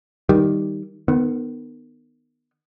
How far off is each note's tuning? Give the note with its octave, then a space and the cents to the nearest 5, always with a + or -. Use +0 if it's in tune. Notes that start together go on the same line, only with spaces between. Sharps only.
D#3 +5 G3 +0
D#3 -30 B3 +0